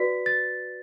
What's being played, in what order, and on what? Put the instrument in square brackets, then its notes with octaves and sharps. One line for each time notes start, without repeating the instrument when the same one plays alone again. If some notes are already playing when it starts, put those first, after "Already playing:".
Already playing: [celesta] F#4 B4 D5 B6
A6